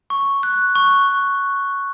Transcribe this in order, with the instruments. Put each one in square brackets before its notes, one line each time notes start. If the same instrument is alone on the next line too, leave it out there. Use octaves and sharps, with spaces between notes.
[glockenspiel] C#6
F#6
C#6